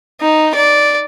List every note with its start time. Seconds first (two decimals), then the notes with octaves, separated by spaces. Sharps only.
0.21 D#4
0.55 D5